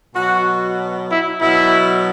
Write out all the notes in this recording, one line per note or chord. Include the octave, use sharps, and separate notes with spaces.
B2 F#3 F#4
E4
B2 F#3 E4